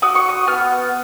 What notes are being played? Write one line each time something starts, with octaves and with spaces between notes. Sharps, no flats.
F#4 D#6
C#6
D#6
B3 F6